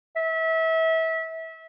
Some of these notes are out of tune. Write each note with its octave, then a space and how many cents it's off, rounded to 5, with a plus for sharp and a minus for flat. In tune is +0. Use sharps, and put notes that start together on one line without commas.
E5 -25